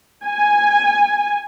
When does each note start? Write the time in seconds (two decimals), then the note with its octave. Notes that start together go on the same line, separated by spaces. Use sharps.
0.25 G#5